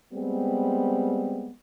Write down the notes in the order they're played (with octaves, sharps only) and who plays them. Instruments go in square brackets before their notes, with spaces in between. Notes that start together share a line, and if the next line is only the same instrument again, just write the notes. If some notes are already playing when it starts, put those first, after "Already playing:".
[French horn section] G3 G#3 B3 C4